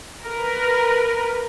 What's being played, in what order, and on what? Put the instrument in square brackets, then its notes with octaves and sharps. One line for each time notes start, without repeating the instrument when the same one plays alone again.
[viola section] A#4 B4